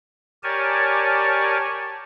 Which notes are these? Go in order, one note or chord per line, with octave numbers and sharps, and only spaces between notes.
G4 A#4 C#5 D5 G#5 A5